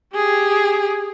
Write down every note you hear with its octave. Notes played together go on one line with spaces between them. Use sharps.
G4 G#4